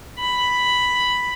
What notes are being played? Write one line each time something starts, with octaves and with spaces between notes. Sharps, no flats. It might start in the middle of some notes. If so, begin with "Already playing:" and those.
B5